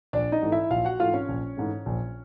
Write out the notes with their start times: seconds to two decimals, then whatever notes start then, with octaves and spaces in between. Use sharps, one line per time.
0.13 A#1 D4 D5
0.32 D#4 D#5
0.42 G#2 E3 A3
0.52 E4 E5
0.70 A#1 F4 F5
0.85 F#4 F#5
0.99 G#2 E3 A3 F4 F5
1.14 C#4 C#5
1.29 A#1
1.57 G#2 E3 A3
1.86 A#1